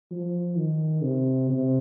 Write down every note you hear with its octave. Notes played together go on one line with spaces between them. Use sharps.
F3
D#3
C3
C3